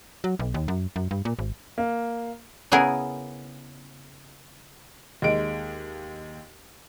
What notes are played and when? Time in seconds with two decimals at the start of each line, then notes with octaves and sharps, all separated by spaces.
0.24 F#3
0.39 B1
0.54 D#2
0.68 F#2
0.96 F#2
1.11 G2
1.25 A#2
1.39 G#1
1.78 A#3
2.72 C#3 B3 E4 G#4 A#4
5.22 D#2 G#3 D7